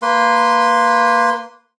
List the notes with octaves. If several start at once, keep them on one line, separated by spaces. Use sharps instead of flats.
A#3 B4 C6